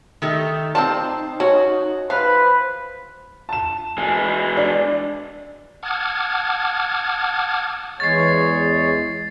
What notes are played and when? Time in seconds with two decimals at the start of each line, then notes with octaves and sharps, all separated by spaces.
0.22 D#3 A3 D#4 G4
0.75 C4 F4 C5 D5 A5
1.40 C#4 F#4
2.10 F3 B4 C5 F5
3.49 A5 E7
3.98 E3 G#3 G#5
4.57 D4
5.83 F#5 A5 D6 D#6 F6 G#6
8.00 E2 G#3 C#5 A6 C7